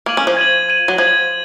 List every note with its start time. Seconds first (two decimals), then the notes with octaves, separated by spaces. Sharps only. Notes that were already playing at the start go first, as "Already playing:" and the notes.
0.06 A#3 G#6 D#7 F#7
0.17 C#4
0.27 F3
0.37 G#6 D#7 F#7
0.69 G#6 D#7 F#7
0.88 F#3
0.98 F3 G#6 D#7 F#7